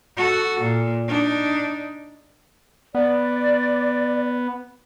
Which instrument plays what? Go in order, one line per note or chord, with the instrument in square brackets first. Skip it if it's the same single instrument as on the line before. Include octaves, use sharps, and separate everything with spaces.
[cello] F#4 A4
A#2
D4 D#4
[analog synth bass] B3 [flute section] D5